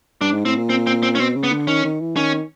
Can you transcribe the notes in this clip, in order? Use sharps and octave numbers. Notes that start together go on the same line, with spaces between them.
G2 D4
G#2
A2 C4
A#2
C4
C4
C4
C#4
B2 C4
C#3
B3
D3
D#3 C#4
D#3
E3
D#3 C#4